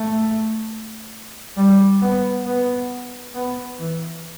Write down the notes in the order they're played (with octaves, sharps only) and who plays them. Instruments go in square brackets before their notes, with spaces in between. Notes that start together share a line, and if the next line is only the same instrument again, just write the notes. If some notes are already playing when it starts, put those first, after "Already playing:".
Already playing: [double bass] A3
G3
B3
B3
B3
E3